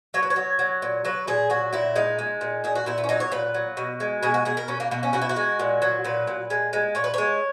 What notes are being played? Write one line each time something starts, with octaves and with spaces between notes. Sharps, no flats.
F#3 C#5
B4
C#5
F#3
F#3
A#2
F#3 B4
A#2 G#4
F#3 F#4
A#2 E4
G#3 D#4
G#3
A#2
A#2 G#4
F#4
A#2 E4
B3
C#4
F#3 D#4
C#5
A#2 B4
F#3
B2
G#3
B2 G#4
F#4
B2 G#4
A#4
B2 C#4
A#3
B2 A#3
C#4
B2 F#4
E4
F#4
G#3
A#2
F#3
A#2 B4
A#2
G#3
G#3
A#2 C#5
B4
G#3 C#5